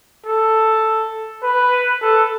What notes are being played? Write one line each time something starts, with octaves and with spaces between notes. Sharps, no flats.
A4
B4
A4